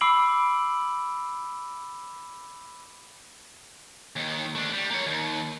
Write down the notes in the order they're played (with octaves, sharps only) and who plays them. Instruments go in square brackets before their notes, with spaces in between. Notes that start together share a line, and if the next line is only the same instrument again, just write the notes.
[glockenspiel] B5 D6 E6 C7 D7 F#7
[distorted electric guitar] D#2 D#3
A3 D4
G3
A#3 C#5
D#2